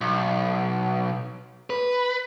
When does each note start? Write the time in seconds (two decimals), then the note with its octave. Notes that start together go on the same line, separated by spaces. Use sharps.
0.01 B1
1.70 B4